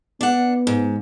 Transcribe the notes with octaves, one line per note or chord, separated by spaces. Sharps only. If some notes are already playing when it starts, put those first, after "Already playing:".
B3 D4 F#5
G#2